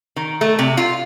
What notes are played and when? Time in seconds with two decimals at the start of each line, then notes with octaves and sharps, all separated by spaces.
0.16 D#3
0.41 A3
0.59 C3
0.77 F4